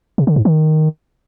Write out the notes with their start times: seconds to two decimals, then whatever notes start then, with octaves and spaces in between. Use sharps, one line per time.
0.18 C3
0.27 D3
0.36 G#2
0.45 D#3